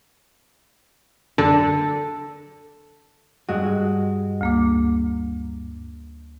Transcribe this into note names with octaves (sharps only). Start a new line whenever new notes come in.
D3 A4
G2 G#3 F#4 D#5
D2 A#3 D6